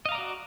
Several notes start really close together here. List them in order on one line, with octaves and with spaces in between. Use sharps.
D#5 F5 A#5 D5 F#4